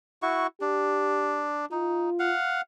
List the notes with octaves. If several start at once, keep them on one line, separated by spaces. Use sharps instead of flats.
E4 F#4 C#6
D4 G4
D#4 F4
F5 F#5